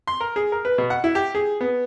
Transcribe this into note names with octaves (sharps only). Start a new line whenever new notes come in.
C6
A#4
G#4
A#4
B4
B2
F#5
E4
G4
G#4
B3